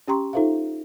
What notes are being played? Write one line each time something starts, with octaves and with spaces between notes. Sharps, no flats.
C#4 G4 G5 A#5 C6 C#6
D#4 F4 A4 C5 E5 F5